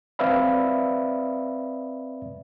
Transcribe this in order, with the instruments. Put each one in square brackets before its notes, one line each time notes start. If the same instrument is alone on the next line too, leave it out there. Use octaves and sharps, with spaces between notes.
[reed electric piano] C4 B4 D5 E5 F5 B5